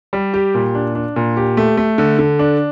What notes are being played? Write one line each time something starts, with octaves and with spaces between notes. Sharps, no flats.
G3
G4
A#2
D4
D4
A#2
G4
A3
A3
D3
D3
D4